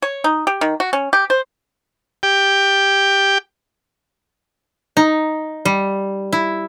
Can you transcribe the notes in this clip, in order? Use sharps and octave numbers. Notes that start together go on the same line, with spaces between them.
C#5
D#4
G4
D#3
F#4
C#4
G4
C5
G4 G5
D#4
G3
E4